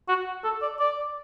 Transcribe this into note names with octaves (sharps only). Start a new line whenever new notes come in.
F#4
A4
D5
D5